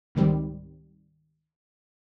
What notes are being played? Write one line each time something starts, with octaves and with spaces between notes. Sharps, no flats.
C#2 G#2 D#3 G3 C4